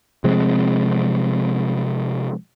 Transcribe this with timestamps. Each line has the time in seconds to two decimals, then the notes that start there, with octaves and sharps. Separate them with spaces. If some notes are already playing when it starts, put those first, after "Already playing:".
0.24 C3 F3 G#3 C4